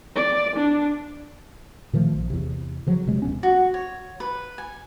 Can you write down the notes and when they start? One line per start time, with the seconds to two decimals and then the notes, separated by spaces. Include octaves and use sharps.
0.15 D5
0.56 D4
1.93 A#2 D#3 F3 A3
2.15 A#1
2.30 E2 C3
2.87 C#3 F3 F#3
3.06 F1 C3 G#3
3.22 D1 E2 B3 C#4
3.43 F#4
3.74 C#5
4.20 B4
4.58 G#5